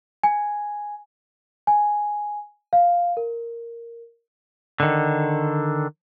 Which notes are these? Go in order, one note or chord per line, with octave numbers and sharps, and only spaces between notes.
G#5
G#5
F5
A#4
D3 D#3